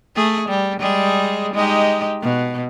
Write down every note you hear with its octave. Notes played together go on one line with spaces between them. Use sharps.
A3 G#4
G3
G3 G#3 G#4
G#3 D#4 G4
B2